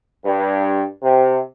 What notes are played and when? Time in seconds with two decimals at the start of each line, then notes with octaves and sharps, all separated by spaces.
0.23 G2
1.02 C3